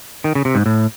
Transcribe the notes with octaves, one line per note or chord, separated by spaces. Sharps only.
D#3
C#3
C3
G#2
A2